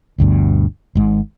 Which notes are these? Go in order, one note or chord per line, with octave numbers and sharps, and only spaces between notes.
G1 D2 G2 B2
G#1 G#2 G#3